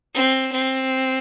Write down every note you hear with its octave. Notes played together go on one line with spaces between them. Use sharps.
C4
C4